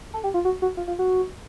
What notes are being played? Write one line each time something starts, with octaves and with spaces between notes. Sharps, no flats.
A4
G4
F4
F#4
F#4
F4
F4
F#4